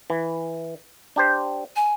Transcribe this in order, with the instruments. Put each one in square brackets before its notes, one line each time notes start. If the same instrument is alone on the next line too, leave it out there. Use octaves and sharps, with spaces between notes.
[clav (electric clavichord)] E3
D4 G4 C5
[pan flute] G#5